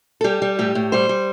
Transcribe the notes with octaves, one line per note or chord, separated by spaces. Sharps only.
A4
G3 G4
G3
A2 G4
A2
G3 C5
G3